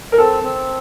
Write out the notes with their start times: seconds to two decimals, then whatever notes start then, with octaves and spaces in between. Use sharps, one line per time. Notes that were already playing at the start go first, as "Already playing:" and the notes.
0.12 A#4
0.18 C4 A4
0.43 C4